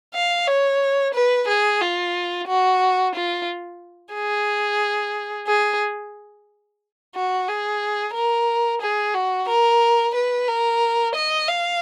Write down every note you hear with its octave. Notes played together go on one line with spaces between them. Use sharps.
F5
C#5
B4
G#4
F4
F#4
F4
G#4
G#4
F#4
G#4
A#4
G#4
F#4
A#4
B4
A#4
D#5
F5